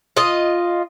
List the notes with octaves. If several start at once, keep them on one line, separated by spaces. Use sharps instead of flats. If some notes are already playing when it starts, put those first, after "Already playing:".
F4 D#5